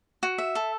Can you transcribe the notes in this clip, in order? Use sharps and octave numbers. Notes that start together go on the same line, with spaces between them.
F#4
E5
A4